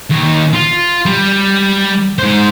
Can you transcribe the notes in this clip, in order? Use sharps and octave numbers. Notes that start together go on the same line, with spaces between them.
D#2
F4
G3
G#2 C5